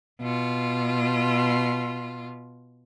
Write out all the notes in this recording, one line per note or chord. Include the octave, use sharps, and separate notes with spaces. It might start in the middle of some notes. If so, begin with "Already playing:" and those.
B2 F4